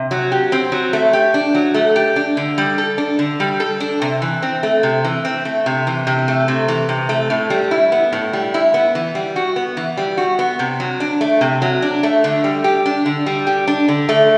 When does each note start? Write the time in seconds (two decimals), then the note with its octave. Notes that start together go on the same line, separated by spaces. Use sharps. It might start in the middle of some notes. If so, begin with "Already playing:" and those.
Already playing: C3
0.11 F#3
0.32 G4
0.52 C4
0.72 F#3
0.93 A3
1.13 G4
1.34 D4
1.55 F#3
1.74 A3
1.96 G4
2.16 D4
2.37 D3
2.58 G3
2.78 A4
2.98 D4
3.19 D3
3.40 G3
3.60 A4
3.80 D4
4.02 C3
4.22 E3
4.42 C4
4.63 A3
4.83 C3
5.04 E3
5.25 C4
5.45 A3
5.66 C3
5.87 E3
6.07 C3
6.28 A3
6.48 C3
6.68 E3
6.89 C3
7.09 A3
7.30 A2
7.50 G3
7.71 E4
7.92 B3
8.13 A2
8.33 G3
8.54 E4
8.74 B3
8.95 E3
9.15 G3
9.36 F#4
9.56 B3
9.77 E3
9.97 G3
10.17 F#4
10.39 B3
10.59 C3
10.80 F#3
11.00 D4
11.21 A3
11.41 C3
11.62 F#3
11.82 D4
12.03 A3
12.24 D3
12.44 G3
12.64 G4
12.86 D4
13.06 D3
13.26 G3
13.47 G4
13.67 D4
13.88 D3
14.09 A3